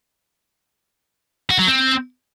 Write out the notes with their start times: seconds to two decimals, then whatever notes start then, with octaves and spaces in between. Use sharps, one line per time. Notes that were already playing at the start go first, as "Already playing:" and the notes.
1.50 F#4
1.59 F#3
1.67 C4